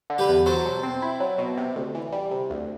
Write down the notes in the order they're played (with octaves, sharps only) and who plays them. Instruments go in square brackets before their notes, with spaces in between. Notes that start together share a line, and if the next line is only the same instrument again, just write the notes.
[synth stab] D3
[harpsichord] G4 B4
[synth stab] E2
[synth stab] F#3 [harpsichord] A4 C5
[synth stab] B2
C4
E4
F#3
B2
C3
D2
E3
G3
C3
D2